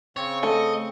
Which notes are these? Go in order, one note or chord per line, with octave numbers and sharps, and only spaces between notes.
C#3 C4 C#5 C#6
A3 A4 D#5